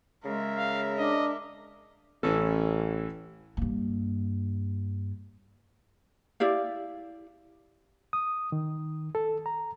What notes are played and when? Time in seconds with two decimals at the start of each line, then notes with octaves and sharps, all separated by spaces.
0.25 C#3 G#3 A#4 E5
0.56 F5
0.98 D4 D#5
2.23 A1 E3 C#4 A4
3.57 G2 A#3
6.40 E4 G4 D5 F5
8.13 D#6
8.52 D#3
9.15 A4
9.46 A#5